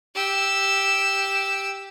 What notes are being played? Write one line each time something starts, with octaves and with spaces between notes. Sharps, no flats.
G4 E6